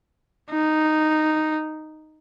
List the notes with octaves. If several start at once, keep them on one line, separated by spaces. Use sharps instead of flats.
D#4